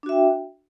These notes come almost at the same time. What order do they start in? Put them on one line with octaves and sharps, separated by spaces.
D4 F#4 E5 G5